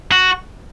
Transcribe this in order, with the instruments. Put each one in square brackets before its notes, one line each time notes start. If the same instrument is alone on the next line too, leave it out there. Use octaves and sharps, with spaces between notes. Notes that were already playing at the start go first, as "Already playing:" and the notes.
[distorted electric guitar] F#4